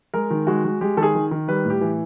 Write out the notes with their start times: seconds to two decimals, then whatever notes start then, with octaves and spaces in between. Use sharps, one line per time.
0.14 G#3 A#4
0.31 D#3
0.47 G#3 F#4
0.65 G#3
0.81 G#3 G4
0.97 D#3 A4
1.03 G#4
1.15 D#3
1.31 D#3
1.48 G3 B4
1.65 A2
1.70 G4
1.81 E3